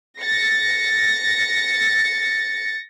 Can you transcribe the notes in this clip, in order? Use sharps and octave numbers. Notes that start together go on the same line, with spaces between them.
A6 A#6 C#7